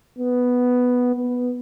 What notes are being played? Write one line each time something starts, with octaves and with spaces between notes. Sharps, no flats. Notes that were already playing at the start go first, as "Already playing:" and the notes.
B3
B3